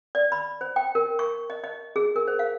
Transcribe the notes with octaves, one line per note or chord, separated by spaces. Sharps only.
D5
B5
C5
G5
A#4
C#6
D#5
D#5
G#4
A#4
C5
F5